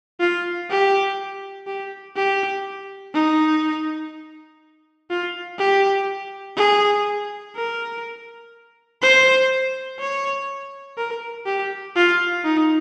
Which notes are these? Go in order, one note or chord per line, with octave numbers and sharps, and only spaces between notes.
F4
G4
G4
G4
D#4
F4
G4
G#4
A#4
C5
C#5
A#4
G4
F4
D#4